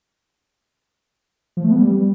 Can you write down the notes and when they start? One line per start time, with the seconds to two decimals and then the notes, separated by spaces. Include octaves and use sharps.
1.57 F3
1.64 A3
1.71 B3
1.79 G3